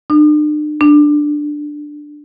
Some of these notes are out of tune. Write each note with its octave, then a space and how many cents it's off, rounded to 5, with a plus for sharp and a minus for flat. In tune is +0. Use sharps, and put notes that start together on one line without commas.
D4 +45
D4 +10